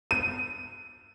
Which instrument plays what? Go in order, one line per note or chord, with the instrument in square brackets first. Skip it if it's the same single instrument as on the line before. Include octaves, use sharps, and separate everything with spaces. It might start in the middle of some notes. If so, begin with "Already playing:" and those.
[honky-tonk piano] D#7